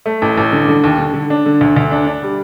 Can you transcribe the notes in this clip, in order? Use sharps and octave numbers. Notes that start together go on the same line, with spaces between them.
A3
A1
A1
D3
D3
D#2
D3
D3
D4
D3
D2
D2
D4
D4
G3